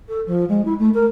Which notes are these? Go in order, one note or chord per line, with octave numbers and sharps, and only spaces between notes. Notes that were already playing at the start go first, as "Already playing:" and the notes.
A4
F3
G#3
E4
A3
A#4